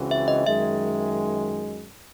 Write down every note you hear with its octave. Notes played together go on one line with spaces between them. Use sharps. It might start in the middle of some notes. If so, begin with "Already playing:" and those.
Already playing: C#2 C#3 E3 C4 F#4
E5
D#5
F#2 D#3 G#3 E5